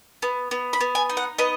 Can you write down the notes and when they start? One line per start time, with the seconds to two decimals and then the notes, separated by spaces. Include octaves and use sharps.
0.22 B3
0.51 B3
0.73 B5
0.81 B3
0.95 G#5
1.09 D#4
1.17 F#5
1.38 B3 D#5